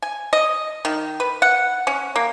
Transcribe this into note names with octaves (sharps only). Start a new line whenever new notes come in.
G#5
D#5
D#3
B4
F#5
C#4
A#3